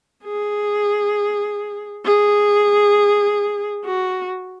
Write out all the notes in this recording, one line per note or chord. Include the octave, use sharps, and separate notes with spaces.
G#4
G#4
F#4